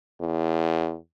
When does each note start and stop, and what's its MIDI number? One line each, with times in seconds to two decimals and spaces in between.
0.21 0.96 40